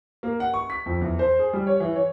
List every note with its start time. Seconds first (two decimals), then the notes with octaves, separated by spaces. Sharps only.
0.23 A#3
0.40 F#5
0.54 C#6
0.70 B6
0.86 F2
1.01 E2
1.19 C5
1.39 G#4
1.53 G3
1.67 C#5
1.80 E3
1.96 C#5